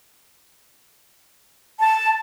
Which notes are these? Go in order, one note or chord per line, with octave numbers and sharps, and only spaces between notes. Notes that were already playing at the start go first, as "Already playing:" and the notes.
A5